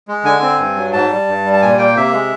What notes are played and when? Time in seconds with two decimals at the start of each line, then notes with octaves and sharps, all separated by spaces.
0.08 G#3
0.24 D3 G#5
0.42 C4
0.59 G2
0.76 F#3
0.93 G#2 A5
1.10 G3
1.28 G2
1.45 G3
1.53 A5
1.62 A#2 G#5
1.79 A#3 G5
1.96 C3 E5
2.13 G#3